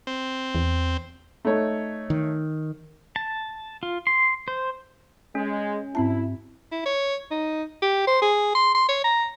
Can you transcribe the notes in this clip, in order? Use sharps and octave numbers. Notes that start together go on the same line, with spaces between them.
C4
E2
A3 D#4 C#5
D#3
A5
F4
C6
C5
G#3 C#4
G#2 C4 E4 A5
E4
C#5
D#4
G4
C5
G#4
C6
C6
C#5
A#5